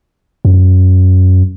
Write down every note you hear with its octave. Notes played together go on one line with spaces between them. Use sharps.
F#2